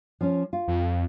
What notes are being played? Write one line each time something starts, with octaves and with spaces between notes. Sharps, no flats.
F3 C#4
F4
F2